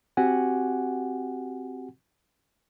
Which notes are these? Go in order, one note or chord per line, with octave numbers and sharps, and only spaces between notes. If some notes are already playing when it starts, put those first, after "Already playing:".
C4 F#4 G4 F#5 G#5